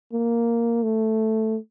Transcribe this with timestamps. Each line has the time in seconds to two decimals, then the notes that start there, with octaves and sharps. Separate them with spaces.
0.13 A#3
0.83 A3